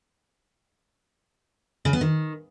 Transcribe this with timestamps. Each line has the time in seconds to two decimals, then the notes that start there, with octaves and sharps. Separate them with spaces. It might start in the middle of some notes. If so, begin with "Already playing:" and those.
1.85 C#3
1.93 B3
2.01 D#3